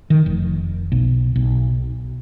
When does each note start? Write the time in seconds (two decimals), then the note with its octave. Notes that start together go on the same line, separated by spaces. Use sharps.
0.10 D#3
0.26 F1
0.92 B1
1.36 B1